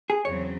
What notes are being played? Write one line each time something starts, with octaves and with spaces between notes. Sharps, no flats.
G#4
E2 C#3 F#3 C4 C#5